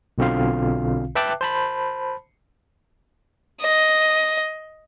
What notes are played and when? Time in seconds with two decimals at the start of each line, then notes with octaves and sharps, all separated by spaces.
0.18 B1 B2 D3 C4 F4 F5
1.15 B4 E5 G5 A5 D6 F#6
1.41 C5 A5 B5
3.61 D#5